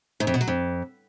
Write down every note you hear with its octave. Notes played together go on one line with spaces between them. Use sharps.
G#2
F2
B2
F#3
F2